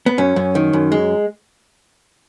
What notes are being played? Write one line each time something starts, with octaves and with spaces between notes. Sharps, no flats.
B3
F#2 C#4
F#2
D#3
F#2
G#3